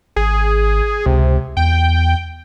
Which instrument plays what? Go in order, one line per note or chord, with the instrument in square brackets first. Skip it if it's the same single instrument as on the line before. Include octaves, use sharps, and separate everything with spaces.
[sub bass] G#1 [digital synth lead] G#4
[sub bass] C#2 [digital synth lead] C3
[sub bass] E2 [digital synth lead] G5